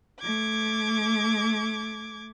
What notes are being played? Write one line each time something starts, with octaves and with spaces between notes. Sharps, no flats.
A3 D6 G#6